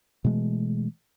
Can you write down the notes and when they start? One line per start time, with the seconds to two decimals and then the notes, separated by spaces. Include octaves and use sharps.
0.24 B2 E3 G#3 A3